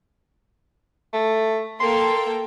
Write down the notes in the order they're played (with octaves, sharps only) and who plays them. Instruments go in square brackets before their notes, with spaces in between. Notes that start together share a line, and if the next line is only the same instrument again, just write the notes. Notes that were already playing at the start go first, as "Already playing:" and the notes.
[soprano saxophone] A3
[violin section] A#3 A4 G5 [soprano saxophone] C6